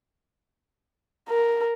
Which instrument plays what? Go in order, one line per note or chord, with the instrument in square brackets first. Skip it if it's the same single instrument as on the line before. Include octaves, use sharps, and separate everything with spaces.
[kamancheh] A#4